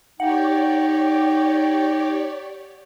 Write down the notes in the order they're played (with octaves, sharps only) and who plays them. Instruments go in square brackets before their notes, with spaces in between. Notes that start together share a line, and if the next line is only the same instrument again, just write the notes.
[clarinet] D#4 [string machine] G4 C#5 D5 [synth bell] F#5 [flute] G5